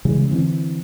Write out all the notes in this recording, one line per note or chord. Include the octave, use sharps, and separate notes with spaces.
C#3 E3 G3 G#3
D3 E3 C4